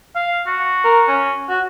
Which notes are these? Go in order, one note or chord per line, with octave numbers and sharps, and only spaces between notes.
F5
F#4
A#4
C#4
F#4